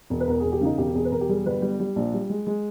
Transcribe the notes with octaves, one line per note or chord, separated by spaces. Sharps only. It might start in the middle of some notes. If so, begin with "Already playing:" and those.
E1
B4
E2 A#4
E1 G#4
G4
C#3 D#4
E1 G4
E1 G#4
B4
E1 A#4
G4
G3 G#4
G1 B4
G3
G3
A#1
G3
G#3
G#3